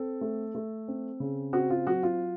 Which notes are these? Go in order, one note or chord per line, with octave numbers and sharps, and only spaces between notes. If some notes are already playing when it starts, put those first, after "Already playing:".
Already playing: C4 A4
A3
A3
C4
C#3
C4 F#4
F4
F#3 F#4
F4